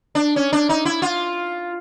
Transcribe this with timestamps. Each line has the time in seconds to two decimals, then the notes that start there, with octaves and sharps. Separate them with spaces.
0.15 D4
0.36 C#4
0.53 D4
0.69 D#4
0.85 E4
1.02 F4